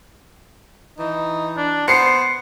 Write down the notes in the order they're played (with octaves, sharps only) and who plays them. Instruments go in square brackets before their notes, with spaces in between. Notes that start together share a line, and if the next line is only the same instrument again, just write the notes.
[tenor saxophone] E3 [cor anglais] D#4
[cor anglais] D4
[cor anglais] B3 [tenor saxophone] C5 [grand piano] C7 C#7